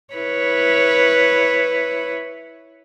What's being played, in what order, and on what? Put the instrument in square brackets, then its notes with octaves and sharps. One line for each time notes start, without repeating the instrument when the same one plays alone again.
[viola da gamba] E4 B4 C#5